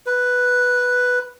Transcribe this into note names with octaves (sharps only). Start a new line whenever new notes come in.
B4